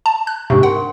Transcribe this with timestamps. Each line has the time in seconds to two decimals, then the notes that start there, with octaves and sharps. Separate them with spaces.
0.06 A5
0.27 F#6
0.50 G#2 C3 D4 G4 C#6
0.63 A#4 F#5 C6